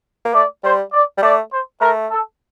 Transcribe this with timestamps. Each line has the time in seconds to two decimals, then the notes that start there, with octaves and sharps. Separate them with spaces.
0.25 A#3
0.34 A3 D5
0.64 G3 C5
0.92 D5
1.17 G3
1.22 A3 D5
1.52 C5
1.81 A3 A#4
2.10 A4